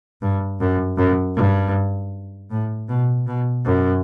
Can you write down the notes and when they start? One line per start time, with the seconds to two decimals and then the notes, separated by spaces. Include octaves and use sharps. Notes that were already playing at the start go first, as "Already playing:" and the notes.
0.22 G2
0.60 F#2
0.97 F#2
1.36 G2
2.51 A2
2.89 B2
3.27 B2
3.65 F#2